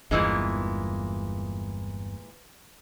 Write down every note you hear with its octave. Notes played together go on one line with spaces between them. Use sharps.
G1 E2 G2 A#2 E3 G#3